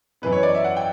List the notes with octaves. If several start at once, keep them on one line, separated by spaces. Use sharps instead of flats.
F#2 E3 B3 B4
C#5
D5
E5
F#5
G5